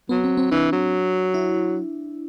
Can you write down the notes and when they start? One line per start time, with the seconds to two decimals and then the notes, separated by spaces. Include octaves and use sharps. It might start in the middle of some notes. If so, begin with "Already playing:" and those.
0.09 F#3 B3
0.24 C4
0.37 C4
0.51 E3 D4
0.73 F#3
1.34 E4